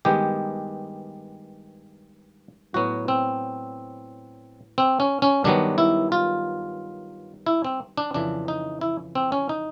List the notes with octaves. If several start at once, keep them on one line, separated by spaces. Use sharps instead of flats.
G2 D#3 G#3 B3 G4
A2 F#3 B3 F#4
C4
C4
C#4
C#4
G2 D#3 F#3 B3 D4
E4
F4
E4
C4
D4
F2 C#3 E3 D4
D#4
E4
C4
C#4
D#4